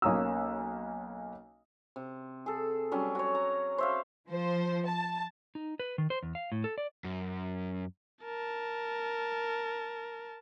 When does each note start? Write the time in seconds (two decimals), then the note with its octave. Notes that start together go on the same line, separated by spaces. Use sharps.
0.02 B1 A#3 C#4 A#5 D#6 E6
1.96 C3
2.46 G#4 A4
2.92 F#3 G3 C#4
3.15 F#4 C#5
3.35 A#5
3.78 C5 E5 F5
4.28 F3 C5
4.86 A5
5.55 D#4
5.80 B4
5.98 D#3
6.10 C5
6.23 E2
6.35 F5
6.52 A2
6.64 A4
6.78 D5
7.04 F#2
8.24 A#4 A5